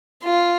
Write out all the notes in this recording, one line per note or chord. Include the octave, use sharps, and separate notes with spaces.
F4